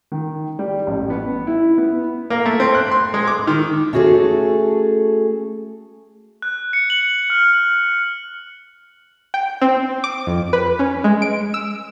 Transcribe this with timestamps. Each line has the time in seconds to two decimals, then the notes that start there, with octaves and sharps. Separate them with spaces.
0.12 D#3
0.59 G3
0.87 A1
1.10 B3
1.47 E4
1.78 B3
2.30 A#3
2.46 A3
2.60 C4
2.75 F#6
2.91 C6
3.14 G#3
3.27 D6
3.47 D#3
3.93 A3 C#4 F#4 G#4 A4
6.42 F#6
6.73 C#7
6.90 F#7
7.30 F6
9.34 G5
9.62 C4
10.04 D6
10.27 F2
10.53 B4
10.79 C#4
11.04 G#3
11.22 D7
11.54 E6